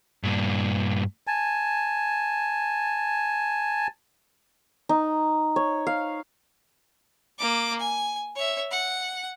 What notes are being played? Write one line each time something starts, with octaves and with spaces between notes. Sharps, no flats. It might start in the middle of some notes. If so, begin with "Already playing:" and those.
G2 A#2
G#5 A5
D#4
C#5
F5
A#3 D6
G#5
C#5 E5
F#5